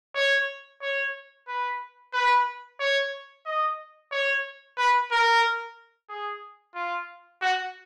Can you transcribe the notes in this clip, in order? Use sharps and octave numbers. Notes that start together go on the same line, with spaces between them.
C#5
C#5
B4
B4
C#5
D#5
C#5
B4
A#4
G#4
F4
F#4